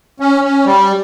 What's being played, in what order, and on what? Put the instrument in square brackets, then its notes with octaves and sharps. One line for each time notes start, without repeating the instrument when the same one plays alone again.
[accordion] C#4
C#4
G3